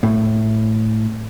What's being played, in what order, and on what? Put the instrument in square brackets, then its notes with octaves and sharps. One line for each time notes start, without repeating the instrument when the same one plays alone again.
[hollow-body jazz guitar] A2